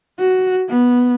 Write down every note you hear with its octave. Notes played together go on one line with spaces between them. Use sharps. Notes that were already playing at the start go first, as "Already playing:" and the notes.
F#4
B3